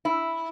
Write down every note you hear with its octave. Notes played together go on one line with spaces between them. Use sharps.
E4